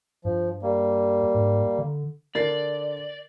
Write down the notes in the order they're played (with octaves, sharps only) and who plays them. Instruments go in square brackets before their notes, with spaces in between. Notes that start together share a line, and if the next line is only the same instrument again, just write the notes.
[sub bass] G2 [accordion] F3
[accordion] G3 A#3
[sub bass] G#2
D3
[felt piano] D3 A6 C7 [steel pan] A#4 [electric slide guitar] D5